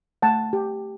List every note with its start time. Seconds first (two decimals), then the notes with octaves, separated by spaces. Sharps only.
0.22 A3 F#5 A5
0.53 G4